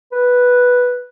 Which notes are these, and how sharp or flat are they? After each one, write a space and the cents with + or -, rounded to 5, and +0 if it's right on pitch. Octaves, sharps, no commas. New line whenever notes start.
B4 -5